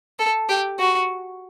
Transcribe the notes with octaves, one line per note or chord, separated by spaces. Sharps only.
A4
G4
F#4